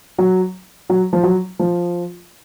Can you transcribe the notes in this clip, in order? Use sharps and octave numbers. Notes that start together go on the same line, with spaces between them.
F#3
F#3
F3
F#3
F3